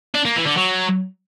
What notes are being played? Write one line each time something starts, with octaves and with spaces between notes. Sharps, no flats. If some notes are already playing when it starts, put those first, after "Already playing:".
D4
A#3
E3
D3
F#3